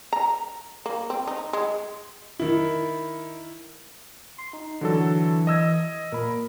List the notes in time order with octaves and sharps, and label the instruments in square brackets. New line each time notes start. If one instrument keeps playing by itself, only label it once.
[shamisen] A#5
A#3
C4
D#4
G#3
[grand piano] D#3 E4
[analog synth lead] C6
D#4
[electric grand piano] D3 F#3 A4 [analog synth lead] E3
[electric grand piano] D#5 E6 G#6
[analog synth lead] A#2 [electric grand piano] A#4 B5